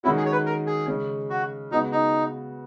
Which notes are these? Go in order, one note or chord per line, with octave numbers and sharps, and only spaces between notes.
D#3 G#3 C#4 E4 F#4
G#4
C#5
B4
A#4
G#4
C#3 G#3 C#4
F#4
C#3 G#3 B3 D#4 F#4
D#4